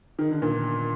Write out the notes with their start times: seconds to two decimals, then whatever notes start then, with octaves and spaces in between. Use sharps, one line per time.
0.19 D#3
0.31 D3
0.42 A#2